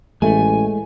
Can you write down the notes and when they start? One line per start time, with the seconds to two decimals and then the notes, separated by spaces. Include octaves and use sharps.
0.22 A1 G#3 A3 G#5